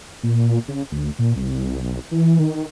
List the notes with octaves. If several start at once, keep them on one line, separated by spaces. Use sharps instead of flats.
A#2
C#3
D2
A#2
C2
B1
E3
D#3